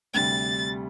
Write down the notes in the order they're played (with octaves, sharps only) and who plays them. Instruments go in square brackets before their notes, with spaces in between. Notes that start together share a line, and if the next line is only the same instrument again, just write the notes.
[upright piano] D2 C3 G3 [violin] A6